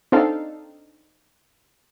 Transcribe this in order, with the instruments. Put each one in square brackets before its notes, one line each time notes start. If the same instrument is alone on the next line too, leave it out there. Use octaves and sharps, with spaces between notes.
[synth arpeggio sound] C4 D4 D#4 A4 F5